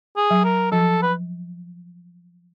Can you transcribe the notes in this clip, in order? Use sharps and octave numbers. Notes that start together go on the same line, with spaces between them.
G#4
F#3
A#4
F3 A4
B4